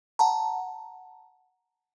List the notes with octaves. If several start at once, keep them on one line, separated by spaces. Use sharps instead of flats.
F#5 A5 A#5